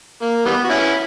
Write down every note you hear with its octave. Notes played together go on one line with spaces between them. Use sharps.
A#3
E3 G3 B3
F#4
C#4 E4